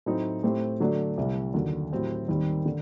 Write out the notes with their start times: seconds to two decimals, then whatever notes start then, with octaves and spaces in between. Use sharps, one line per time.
0.06 A2 F#3 A3 C4 D#4
0.43 A2 A3 C4 G4 C5
0.80 D3 F#3 A3 D4
1.17 C2 C3 G3
1.54 D#2 D3 F#3
1.92 A2 F#3 C4 G4
2.28 D#2 D#3 G3 C4 G4
2.66 D3